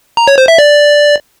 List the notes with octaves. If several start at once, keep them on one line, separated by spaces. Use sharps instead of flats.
A#5
C#5
C5
E5
D5